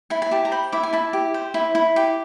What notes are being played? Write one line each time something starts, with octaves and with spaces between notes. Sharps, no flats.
E4 G#5
G#5
G4 A5
A#5
C5 B5
E4 D6
G#5
E4 A5
G4
C5
E4
E4
G4